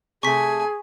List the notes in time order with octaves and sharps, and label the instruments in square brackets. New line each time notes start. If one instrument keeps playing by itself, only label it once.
[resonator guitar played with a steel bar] C3 A3 [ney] G#4 [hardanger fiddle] G#5 [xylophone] C#6 B6